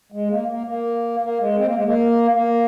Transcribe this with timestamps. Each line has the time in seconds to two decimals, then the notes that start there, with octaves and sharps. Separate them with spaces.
0.12 G#3
0.30 A#3
0.48 A#3
0.67 A#3
1.22 A#3
1.40 G#3
1.58 C4
1.66 A#3
1.75 G#3
1.84 A#3
2.32 A#3